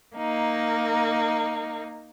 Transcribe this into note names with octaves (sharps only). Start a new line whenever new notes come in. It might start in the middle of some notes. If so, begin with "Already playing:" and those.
A#3 D#4